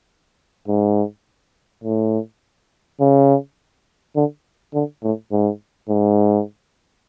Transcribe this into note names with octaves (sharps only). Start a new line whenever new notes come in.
G#2
A2
C#3
D3
D3
A2
G#2
G#2